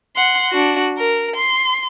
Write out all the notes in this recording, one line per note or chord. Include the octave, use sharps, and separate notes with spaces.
F#5 C6
D4 F#4
A#4
C6